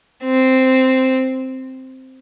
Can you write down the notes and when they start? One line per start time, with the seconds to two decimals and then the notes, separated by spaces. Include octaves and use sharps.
0.24 C4